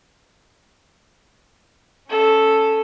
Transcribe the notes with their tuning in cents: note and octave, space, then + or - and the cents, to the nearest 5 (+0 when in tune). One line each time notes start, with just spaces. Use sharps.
C#4 +0 A4 +0